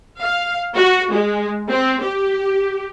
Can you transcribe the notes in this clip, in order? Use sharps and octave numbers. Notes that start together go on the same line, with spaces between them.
F5
F#4
G#3
C4
G4